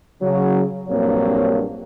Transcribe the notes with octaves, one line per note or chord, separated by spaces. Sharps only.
C#3 F#3
A#1 G2 F#3 A#3 C4 C#5